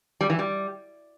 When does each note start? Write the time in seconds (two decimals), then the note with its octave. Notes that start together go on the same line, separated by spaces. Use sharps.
0.21 G3
0.30 E3
0.39 G3